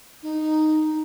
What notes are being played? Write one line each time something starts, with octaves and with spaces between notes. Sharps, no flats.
D#4